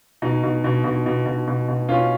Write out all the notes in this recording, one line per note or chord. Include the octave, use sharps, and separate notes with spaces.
B2 D#4
B2
B2
B2
B2
B2
B2
B2
B2 C#4 F4